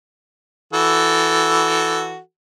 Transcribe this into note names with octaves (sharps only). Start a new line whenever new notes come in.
E3 F#4 A4